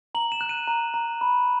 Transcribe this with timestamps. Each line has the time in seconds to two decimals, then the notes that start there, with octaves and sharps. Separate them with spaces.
0.15 A#5 F#7
0.32 E7
0.41 F#6
0.49 D#7
0.67 A#5
0.94 A#5
1.21 B5